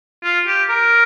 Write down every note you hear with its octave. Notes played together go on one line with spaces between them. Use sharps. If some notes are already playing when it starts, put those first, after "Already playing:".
F4
G4
A#4